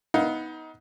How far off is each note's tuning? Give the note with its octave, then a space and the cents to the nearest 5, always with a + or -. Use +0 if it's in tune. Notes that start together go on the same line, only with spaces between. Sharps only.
B3 +0 D#4 +25 F5 +0